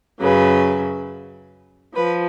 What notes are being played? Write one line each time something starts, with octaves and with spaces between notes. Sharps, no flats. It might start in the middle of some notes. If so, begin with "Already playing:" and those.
F#2 C#3 F#3 B4
F3 B4